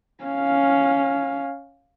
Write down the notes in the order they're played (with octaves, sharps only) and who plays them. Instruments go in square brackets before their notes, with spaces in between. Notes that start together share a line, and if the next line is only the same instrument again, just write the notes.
[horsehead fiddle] C#4 F5